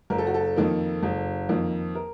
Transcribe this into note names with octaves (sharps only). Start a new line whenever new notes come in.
F#1 A#4
A4
F#4
A4
F2 D#3 A#3
F#1
F2 D#3 A#3
A#4